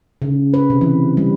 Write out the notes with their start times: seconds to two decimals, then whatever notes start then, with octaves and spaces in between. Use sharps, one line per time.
0.22 C#3
0.54 B4
0.70 C3
0.81 E3
1.17 G3